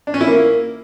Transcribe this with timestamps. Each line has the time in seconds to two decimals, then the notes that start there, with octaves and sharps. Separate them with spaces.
0.07 D4
0.14 C#4
0.21 E4
0.28 A#3